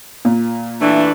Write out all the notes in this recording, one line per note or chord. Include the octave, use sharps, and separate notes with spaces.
A#2
E3 A3 D4